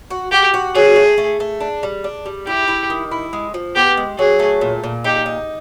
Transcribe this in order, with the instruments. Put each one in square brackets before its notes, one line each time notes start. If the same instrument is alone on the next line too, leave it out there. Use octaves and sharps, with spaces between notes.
[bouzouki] F#4
[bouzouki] F#4 [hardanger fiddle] G4
[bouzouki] F#4
[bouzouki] F#3 [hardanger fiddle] G#4
[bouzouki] A3
A3
A3
D4
G3
D4
G3
[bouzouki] E4 [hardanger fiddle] G4
[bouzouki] E4
D#3
E4
G#3
F3
[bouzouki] B3 [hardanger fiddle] G4
[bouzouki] G#3
[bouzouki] F#3 [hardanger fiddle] G#4
[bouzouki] A3
A#2
A#2
[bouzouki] D#4 [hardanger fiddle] G4
[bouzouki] D#4